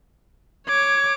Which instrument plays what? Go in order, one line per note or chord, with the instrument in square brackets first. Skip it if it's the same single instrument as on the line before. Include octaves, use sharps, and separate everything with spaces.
[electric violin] C#5 D6 [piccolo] G#6